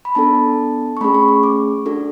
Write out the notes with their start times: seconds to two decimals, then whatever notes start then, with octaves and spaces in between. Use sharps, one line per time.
0.05 B5
0.15 B3 D4 A4 A5
0.97 C#6
1.01 A3 C#4 G#4 B5
1.14 C#6
1.28 C#6
1.43 D6
1.86 D4 F#4 A4